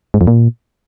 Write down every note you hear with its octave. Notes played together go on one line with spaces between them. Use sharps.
G#2
F2
A#2